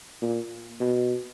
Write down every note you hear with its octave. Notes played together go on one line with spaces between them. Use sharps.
A#2
B2